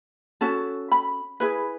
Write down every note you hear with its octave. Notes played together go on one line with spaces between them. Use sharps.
C#4 F#4 A4
B5
E4 G#4 B4